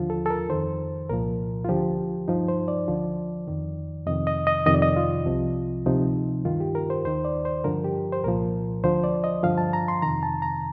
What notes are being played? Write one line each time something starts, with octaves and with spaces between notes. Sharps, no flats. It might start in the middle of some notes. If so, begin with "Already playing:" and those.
Already playing: D#2 D3 F3 F4
A4
A4
A#4
F2 D#3 C5
C2 A#2 F3 A#4
F4
D2 D3 F3 G4
G2 F3 D#4
C5
D5
D2 D3 F3
F2 D#3
F2 C3 D#3 D#5
D#5
D#5
F2 C3 D#3 D#5
D5
D#5
F4
C2 C3 F3
D2 C3 F3 D#4
G2 D#3 F4
G4
A#4
C5
D#2 D#3 C5
D5
C5
G2 D3 F3 A#4
G4
C5
C2 A#2 F3 A#4
D2 D3 F3 C5
D5
D#5
G2 D3 F3 F5
A5
A#5
C6
F2 C3 D#3 A#5
A5
A#5